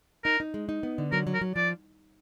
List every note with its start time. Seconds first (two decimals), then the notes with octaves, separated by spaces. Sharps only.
0.25 D#4 A#4
0.40 D#4
0.54 G#3
0.69 D#4
0.83 B3
0.98 D3
1.12 F#3 A#4
1.27 F#3
1.34 A#4
1.41 F#3
1.56 F3 D5